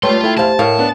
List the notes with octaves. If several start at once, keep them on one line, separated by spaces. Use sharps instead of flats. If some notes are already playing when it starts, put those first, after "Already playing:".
G3 A3 F4 B4 C#5 G5 C6
E4 A4 G5
E2 G4 C5 F5 A5
A2 A#4 C#5 F5
B3 D4